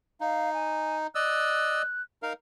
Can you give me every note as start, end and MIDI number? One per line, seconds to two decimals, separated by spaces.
0.21 1.07 63
0.21 0.53 77
0.54 0.97 80
1.15 1.82 74
1.15 1.82 75
1.15 1.82 88
1.15 2.02 90
2.23 2.33 63
2.23 2.33 70
2.23 2.33 77